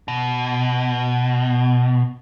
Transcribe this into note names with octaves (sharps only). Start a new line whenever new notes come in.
B2